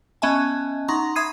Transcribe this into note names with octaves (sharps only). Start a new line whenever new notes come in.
B3 C#4 D#5 E5 G#5 A5
D#4 F#5 A#5 C6 C#6
E5 B5 D#6 G#6 C7 D#7